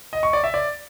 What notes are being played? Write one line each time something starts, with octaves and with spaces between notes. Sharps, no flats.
D#5
C#6
D5
E5
D5